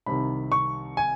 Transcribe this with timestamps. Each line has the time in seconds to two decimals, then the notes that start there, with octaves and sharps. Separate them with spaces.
0.06 C2 C3 D#3 B5
0.52 C#6
0.97 G#5